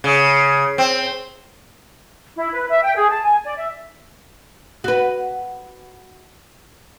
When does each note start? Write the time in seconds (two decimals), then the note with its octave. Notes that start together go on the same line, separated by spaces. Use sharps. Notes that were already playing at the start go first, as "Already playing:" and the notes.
0.04 C#3
0.78 C4
2.37 E4
2.53 B4
2.69 E5
2.83 G5
2.96 G#4
3.10 A5
3.24 G#5
3.44 D5
3.57 E5
4.84 F#4 B4